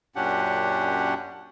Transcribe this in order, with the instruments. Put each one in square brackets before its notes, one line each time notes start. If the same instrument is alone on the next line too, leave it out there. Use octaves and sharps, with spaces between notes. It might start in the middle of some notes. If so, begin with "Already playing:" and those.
[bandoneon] F#2 A#2 C#4 D4 G4 F#5